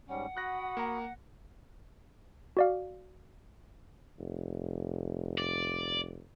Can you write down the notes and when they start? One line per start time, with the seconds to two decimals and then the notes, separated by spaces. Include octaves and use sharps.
0.08 G#2 G3 C#4 F#5
0.37 F#4 B5 D#6 F#6 A#6
0.77 A#3 A#5
2.57 F#4 D5 F5
4.19 F1
5.38 D5